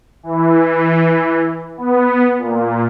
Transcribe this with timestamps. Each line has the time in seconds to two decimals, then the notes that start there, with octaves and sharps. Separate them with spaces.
0.23 E3
1.77 B3
2.38 A#2